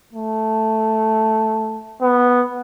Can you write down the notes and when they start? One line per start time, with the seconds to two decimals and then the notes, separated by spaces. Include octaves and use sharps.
0.13 A3
2.01 B3